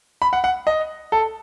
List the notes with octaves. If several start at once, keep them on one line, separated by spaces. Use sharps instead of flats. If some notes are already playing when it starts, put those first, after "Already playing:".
B5
F#5
F#5
D#5
A4